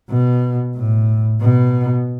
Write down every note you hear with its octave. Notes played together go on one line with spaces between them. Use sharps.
B2
A2
B2